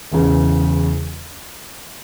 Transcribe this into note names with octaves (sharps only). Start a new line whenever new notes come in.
E1 E2 C#3